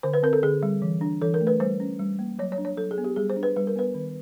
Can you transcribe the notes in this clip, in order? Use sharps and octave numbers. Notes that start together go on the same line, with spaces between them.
D3 C5
B4
C4 A#4
A4
D3 G#4
G3
E3
D4
E3 A4
A#4
A3
B4
G3 C5
C#4
G3
A#3
F#3 C#5
C#5
D4
C#5
F#3 A4
G#4
B3
G4
G3 G#4
C5
D4
B4
G3 B4
A#4
B3 B4
D#3